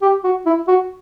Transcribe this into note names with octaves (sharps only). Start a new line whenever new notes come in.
G4
F#4
E4
F#4